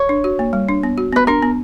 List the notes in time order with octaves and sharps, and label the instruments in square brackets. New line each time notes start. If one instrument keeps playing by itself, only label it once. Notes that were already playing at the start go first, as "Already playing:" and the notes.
Already playing: [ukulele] C#5
[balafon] D4
F#4
A#3
G3
D4
B3
F#4
[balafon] B3 [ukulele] B4
[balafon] D4 [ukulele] A#4
[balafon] B3